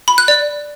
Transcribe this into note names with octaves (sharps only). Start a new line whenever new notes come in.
B5
F#6
D5